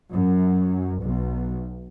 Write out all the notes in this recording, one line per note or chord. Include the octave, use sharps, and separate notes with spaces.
F#2
B1